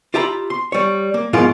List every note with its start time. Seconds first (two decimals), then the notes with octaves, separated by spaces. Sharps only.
0.14 F4 G4 E5 A#5 B5
0.50 C6
0.72 G3 C#5
1.14 A#3
1.33 G#2 B2 F3 A#3 E4 F4